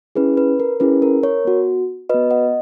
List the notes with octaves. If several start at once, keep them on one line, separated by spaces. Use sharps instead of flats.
C#4 E4 G#4 B4
B4
A#4
C#4 E4 G#4 B4
A#4
A#4 C#5
B3 F#4
B3 F#4 B4 D#5
D#5 F#5